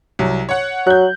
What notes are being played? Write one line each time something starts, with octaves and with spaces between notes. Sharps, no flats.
C2 F#3
C#5 F#5
F#3 F#6 G6